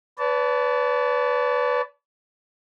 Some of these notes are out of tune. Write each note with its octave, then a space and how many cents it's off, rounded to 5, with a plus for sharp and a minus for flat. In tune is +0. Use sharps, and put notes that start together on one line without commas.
B4 +10 D5 -45 A5 +0